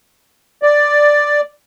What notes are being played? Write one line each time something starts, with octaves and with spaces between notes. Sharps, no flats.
D5